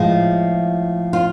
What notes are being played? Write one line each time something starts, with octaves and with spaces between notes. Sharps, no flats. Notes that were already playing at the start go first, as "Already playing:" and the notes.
Already playing: A2 F3 G#3 F4
F4